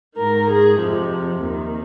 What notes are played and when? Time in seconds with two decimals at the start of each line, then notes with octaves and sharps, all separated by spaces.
0.17 G#2 D#3 A#4
0.49 G#4
0.80 F2 C3 F3
1.43 D#2 D#3